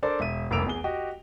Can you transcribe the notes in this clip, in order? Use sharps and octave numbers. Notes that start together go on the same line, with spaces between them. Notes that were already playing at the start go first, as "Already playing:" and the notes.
D4 A4 A#4 C5 D5
E1 E5 D#7
F1 C2 A#3 E6 D7 F7
E2 G#4 G7
F#4 G4 D#5